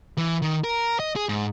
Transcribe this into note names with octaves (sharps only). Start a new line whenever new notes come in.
E3
D#3
A#4
D#5
G#4
G#2